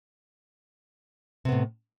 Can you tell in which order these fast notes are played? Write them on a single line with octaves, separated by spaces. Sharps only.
C3 B3 A2